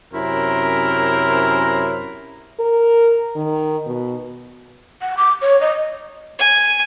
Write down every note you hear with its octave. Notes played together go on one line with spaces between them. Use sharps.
F#2 C3 C#4 E4 A#4 C5
A#4
D#3
B2
F#5
D6
C#5
D#5
G#5